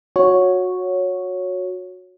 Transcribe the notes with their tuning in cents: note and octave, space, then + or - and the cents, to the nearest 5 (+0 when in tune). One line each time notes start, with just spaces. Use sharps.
F#4 -20 C#5 +0